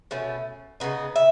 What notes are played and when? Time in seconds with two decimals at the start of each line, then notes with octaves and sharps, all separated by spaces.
0.11 B2 A3 C#4
0.80 C#3 G#3 B3 D#4 D#5
1.16 E5